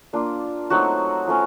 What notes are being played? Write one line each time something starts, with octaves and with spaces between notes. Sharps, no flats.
A#3 D4 F4
F#3 A3 C4 D#4 F#4
F3 A3 C#4